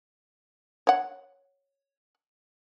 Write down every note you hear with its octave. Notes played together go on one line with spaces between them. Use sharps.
C#5 F#5